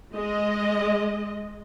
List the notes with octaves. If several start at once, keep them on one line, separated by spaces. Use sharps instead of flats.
G#3 D#5